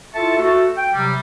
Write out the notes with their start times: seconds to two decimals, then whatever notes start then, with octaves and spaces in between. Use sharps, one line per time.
0.15 E4 F4 A4 E5 A5 C#6
0.39 A3 F#4 A4
0.77 G5
0.94 C3 F#3 G3